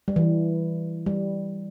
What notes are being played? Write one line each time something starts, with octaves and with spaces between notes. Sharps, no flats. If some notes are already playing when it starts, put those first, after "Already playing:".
G3
E3
G3